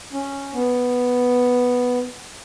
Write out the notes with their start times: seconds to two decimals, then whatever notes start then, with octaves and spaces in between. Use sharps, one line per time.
0.12 C#4
0.54 B3